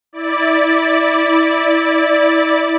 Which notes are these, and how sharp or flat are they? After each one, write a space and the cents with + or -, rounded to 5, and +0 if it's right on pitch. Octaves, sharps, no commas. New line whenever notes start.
E4 -20 D5 +0